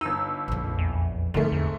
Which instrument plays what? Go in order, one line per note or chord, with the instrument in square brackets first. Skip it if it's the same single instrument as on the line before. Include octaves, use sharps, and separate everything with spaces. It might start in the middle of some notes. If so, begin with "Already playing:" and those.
[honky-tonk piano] G1 E6 [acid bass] D#4
[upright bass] A#1 F2
[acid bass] E2
[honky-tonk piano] G#2 A3 [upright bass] D3 C4 [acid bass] F3
[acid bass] E2